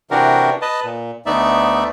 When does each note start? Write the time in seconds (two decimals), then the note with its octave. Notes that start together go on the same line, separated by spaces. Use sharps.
0.11 C3 E3 D4 F#4 G4 A#4
0.62 B4 D#5 A5
0.84 A#2
1.26 D2 A3 B3 D#4 D5 E5